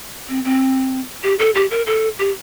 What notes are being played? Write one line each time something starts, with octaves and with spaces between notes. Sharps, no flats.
C4
C4
G4
A4
G4
A#4
A4
G4